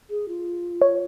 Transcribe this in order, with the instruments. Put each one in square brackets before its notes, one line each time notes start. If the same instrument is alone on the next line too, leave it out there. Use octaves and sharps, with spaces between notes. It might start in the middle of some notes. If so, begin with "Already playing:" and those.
[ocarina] G#4
F4
[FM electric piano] C#5